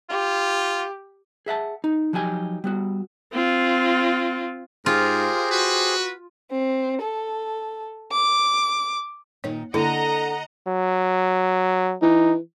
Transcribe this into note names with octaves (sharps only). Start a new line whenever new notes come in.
F4 G4
G#4 E5 F#5 A5
D#4
F3 F#3 D#4 G4 G#5
G3 B3 F#4
C4 F4
G#2 F4 G4 G#4 A#4 C5
F#4 B4
C4
A4
D6
A#2 D#3 D#4 C#5
D3 A#3 D4 E4 A4 D#5 F#5 A#5
F#3
E3 D#4